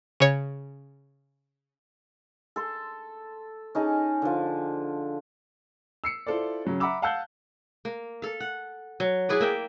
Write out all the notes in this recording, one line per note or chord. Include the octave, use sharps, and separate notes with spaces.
C#3 C#5
A4 C6
C#4 D#4 G#4 A5
D3 F3
E6 C7 C#7
E4 F4 A4 C5 D5
C#3 F#3 C#4
E5 F#5 A#5 B5 D6 E6
F5 F#5 A5 E6 F#6 G6
A#3
A4 F5
F#5
F#3
E4 G#4 B4 D5
A#3 E5 G5